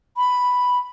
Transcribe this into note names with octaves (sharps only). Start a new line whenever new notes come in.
B5